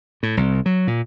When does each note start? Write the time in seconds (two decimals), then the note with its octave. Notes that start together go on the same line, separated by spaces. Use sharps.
0.23 A2
0.37 C2
0.66 F#3
0.87 A#2